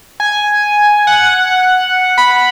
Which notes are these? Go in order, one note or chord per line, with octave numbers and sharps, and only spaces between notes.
G#5
F#5
B5